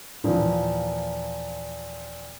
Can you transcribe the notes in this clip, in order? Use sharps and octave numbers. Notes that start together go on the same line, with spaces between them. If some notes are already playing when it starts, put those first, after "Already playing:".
D#2 A#2 E3 F3